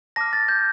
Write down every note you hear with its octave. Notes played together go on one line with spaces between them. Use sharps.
A5 D6 F6 A#6
A6
G6